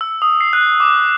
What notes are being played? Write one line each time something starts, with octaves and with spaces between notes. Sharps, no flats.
E6
D#6
C7
F#6
D6